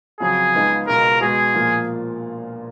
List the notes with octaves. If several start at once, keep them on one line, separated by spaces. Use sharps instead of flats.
F2 C#3 F#3 G#4
C#2 C#3 G#3 B3 D#4
C#2 B2 G#3 A#4
B2 G#3 B3 F#4 G#4
A#1 A#2 F3 A#3 F4